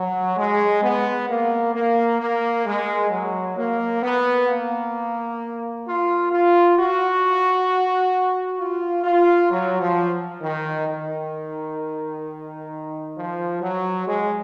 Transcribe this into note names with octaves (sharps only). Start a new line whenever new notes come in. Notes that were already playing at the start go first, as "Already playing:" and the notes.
Already playing: F#3
G#3
B3
A#3
A#3
A#3
G#3
F#3
A#3
B3
A#3
F4
F4
F#4
F4
F4
F#3
F3
D#3
D#3
F3
F#3
G#3